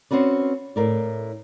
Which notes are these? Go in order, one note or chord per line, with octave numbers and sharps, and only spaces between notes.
C4 C#4 F#4 B4 D5
A2 A#4 D5